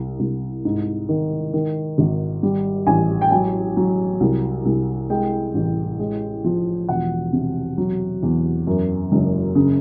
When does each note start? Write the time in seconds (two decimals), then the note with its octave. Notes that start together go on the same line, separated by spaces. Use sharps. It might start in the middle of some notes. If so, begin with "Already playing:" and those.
Already playing: C2
0.19 C2
0.65 G#2
1.09 D#3
1.53 D#3
1.98 G#1
2.43 G3
2.87 A1 G#5
3.21 G5
3.31 F#3 G#5
3.77 F#3
4.20 C2
4.65 C2
5.10 G#3 G5
5.54 A1
5.99 G#3
6.44 F3
6.89 E1 F#5
7.33 C3
7.78 F#3
8.23 E2
8.67 F#2
9.12 F#1
9.55 C#3